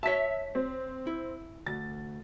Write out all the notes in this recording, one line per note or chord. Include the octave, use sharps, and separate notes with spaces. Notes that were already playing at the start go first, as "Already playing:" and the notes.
C#5 E5 A5 B6
C4
E4
D2 A6